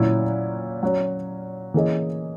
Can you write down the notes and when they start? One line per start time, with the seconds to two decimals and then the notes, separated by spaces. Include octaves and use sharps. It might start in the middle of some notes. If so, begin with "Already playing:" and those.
Already playing: A#2 F#3 C#4 E4
0.83 F#3 C#4 F#4
1.74 E3 A#3 C#4 G#4 D#5